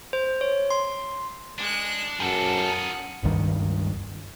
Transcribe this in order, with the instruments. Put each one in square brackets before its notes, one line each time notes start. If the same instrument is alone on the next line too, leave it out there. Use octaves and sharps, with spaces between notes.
[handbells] C5
C#5
C6
[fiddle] G#3 F#6 [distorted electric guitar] D4
[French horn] F#2 [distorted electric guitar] F3 D4 [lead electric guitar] G#4 A4 [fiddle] F#5
[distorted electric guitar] D#4 F4
[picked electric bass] F#1 C#2 G2 D#3